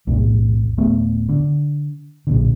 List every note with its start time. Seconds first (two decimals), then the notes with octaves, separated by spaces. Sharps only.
0.07 B1 E2 A2 C3
0.78 D1 A3 B3
1.29 D3
2.27 B1 A#2 D3